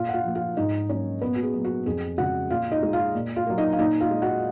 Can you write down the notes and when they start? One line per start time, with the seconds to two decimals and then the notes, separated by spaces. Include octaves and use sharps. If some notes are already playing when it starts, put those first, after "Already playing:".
Already playing: A#2 F4 F5
0.09 F#5
0.14 F4 F5
0.25 F3 A#3
0.35 F4 F5
0.57 G#2 D#4 D#5
0.89 F#3 A#3 C#4 C#5
1.21 A#2 B3 B4
1.36 F#4
1.43 G#4
1.53 F#3 A#3
1.65 F#4
1.86 F2 G#4
2.18 C#3 G#3 F#4 F#5
2.50 A#2 F4 F5
2.71 D#4 D#5
2.83 G#3
2.93 F4 F5
3.15 A#2
3.36 F4 F5
3.47 F#3 A#3
3.58 D#4 D#5
3.73 F5
3.79 A#2 D#4 D#5
4.00 F4 F5
4.11 G#3
4.22 F#4 F#5